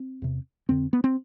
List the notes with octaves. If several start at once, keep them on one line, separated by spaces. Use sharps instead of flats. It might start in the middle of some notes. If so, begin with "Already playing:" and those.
Already playing: C4
E2 C3
F2 D3 C4
B3
C4